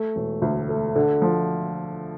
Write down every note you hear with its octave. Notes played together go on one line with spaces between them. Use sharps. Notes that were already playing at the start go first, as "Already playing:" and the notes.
Already playing: A3
E1
D2
A3
D3
F3